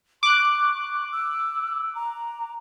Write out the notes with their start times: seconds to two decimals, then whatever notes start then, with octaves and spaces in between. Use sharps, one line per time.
0.23 C#6 D6 F#6
1.12 E6
1.95 A#5